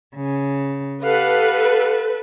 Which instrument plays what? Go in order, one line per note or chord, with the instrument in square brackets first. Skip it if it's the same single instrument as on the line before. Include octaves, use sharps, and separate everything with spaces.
[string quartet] C#3
[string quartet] G4 F5 F#5 [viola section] A4 B4